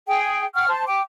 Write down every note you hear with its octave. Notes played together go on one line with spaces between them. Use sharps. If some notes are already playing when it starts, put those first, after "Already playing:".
G#4 G5
F#5 G5 C#6 F6
C5 A5
G5 D6